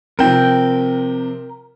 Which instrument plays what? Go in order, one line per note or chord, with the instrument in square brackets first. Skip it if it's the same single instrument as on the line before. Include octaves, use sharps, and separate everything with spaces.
[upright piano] C3 F3 C4 [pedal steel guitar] A#4 G5